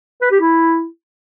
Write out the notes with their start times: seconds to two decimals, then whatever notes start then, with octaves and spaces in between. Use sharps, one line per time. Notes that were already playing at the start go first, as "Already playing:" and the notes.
0.22 B4
0.31 G4
0.41 E4